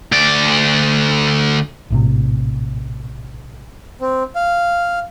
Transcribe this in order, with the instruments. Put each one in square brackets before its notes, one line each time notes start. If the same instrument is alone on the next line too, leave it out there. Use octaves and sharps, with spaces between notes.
[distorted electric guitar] D2 D5
[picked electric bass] A#1 A2 C3
[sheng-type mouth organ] C4
F5